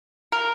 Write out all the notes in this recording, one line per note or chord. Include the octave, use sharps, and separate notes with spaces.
A#4